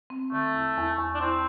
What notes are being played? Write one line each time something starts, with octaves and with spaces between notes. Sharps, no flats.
C4
D3 A3
E2
E2
E2
D4
C4 E4